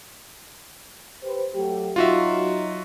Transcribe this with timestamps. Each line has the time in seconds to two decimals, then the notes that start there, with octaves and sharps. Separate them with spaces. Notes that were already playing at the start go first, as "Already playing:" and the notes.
1.23 G4 B4 C5
1.55 F#3 A3 G4
1.96 F#3 D#4 F4 F#4 E5